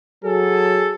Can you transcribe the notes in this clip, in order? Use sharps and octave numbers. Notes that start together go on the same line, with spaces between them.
F#3 G#4 A4